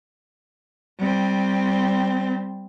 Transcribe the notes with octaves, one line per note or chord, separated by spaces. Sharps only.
G3 C4